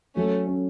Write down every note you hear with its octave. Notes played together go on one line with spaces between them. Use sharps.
F#3 A3 C#4
C#4